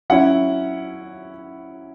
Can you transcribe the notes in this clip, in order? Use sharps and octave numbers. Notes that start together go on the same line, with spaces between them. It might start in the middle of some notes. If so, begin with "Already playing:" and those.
F#3 C#4 E4 F#5